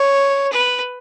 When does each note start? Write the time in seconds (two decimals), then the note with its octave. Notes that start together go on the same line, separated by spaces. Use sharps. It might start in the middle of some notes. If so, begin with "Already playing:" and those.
Already playing: C#5
0.52 B4